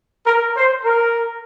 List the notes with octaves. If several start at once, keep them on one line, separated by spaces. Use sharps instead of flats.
A#4
C5
A#4